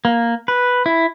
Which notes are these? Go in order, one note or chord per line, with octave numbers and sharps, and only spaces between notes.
A#3
B4
E4